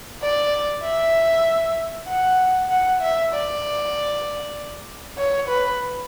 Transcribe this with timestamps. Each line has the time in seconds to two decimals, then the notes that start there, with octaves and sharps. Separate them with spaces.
0.21 D5
0.83 E5
2.08 F#5
2.70 F#5
3.01 E5
3.33 D5
5.18 C#5
5.49 B4